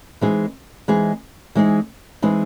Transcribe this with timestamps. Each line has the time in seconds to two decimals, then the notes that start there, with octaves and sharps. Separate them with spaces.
0.21 E3 G#3 C4 D#4 G#4
0.88 E3 G#3 C4 D#4 G#4
1.55 E3 G#3 C4 D#4 G#4
2.22 E3 G#3 C4 D#4 G#4